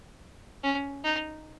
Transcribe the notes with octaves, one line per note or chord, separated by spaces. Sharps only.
C#4
D#4